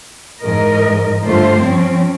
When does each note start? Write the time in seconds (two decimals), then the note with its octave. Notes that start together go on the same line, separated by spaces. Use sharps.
0.41 G#2 E3 A#4 D#5
1.24 G2 D3 A3 F4 C5
1.61 F3 C4 C#4